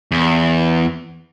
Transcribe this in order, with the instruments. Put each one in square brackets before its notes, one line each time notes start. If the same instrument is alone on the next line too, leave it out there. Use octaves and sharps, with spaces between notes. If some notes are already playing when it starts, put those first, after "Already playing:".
[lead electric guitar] E2